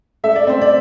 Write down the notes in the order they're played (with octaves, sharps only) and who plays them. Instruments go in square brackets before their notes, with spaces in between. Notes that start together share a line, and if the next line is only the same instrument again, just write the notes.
[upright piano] A3 E5
D5
C4 C5
D5